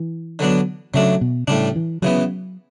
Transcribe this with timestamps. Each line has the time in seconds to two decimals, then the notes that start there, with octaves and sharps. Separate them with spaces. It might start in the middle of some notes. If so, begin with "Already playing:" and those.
Already playing: E3
0.39 D3 F#3 B3 D4
0.94 C#3 F#3 A3 D4
1.21 B2
1.48 A2 C#3 G3 D4
1.75 E3
2.02 C#3 E3 F#3 B3